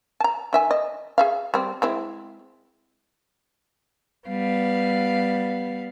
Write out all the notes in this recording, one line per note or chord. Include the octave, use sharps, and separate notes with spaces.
A5 A#5
D#3 E5 G#5
D#5
G#4 E5 F5
G3 C4
G#3 C4 E4
G3 B3 F5